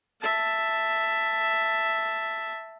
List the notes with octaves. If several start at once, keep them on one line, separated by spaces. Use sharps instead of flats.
E5 A5